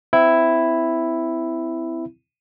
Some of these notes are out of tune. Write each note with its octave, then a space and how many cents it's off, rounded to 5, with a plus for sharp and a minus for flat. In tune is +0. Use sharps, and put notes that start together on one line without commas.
C4 -30 E4 +0